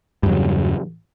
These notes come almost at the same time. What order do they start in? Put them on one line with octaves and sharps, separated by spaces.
G2 E2 F#3 C#3